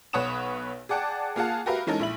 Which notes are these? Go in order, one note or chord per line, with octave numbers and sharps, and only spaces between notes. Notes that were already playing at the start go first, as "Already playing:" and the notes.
B1 B4 C#5 F#5 D#6 E7
G#4 D5 F#5 G5 A5
A#3 F4 G#4 F5 F#5 A5
F#4 G4 A#4 B4 E5 F5
E3 G#3 C#4 D#4 A4 A#4
A#1 E4 F#7